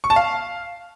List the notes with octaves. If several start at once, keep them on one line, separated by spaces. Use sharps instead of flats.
C#6
A5
F5